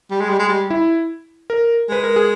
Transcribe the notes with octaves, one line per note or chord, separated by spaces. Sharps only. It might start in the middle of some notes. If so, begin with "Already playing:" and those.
G3
G#3
G3
G#3
G3
E4
A#4
G#3 B4
A#4
G#4